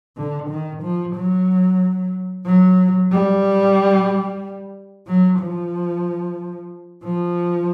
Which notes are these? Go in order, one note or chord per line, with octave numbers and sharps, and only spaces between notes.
D3
D#3
F3
F#3
F#3
G3
F#3
F3
F3